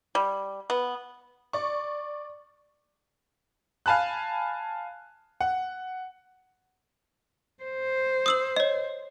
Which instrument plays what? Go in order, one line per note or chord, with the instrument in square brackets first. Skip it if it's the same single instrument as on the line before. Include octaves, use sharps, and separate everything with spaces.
[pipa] G3
B3
[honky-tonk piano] D5 C#6
[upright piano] F5 G#5 A5 B5 F#6
F#5
[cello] C5
[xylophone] D#6 E6 F#7
C#5 D#5